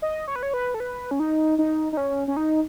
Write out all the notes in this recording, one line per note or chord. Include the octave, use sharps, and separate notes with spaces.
D#5
C#5
B4
C#5
B4
A4
B4
C#4
D#4
D#4
D#4
C#4
C#4
D#4